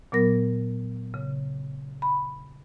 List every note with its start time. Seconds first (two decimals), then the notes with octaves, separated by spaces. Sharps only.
0.12 A#2 F#3 B3 A#4 A#6
1.14 C#3
2.02 B5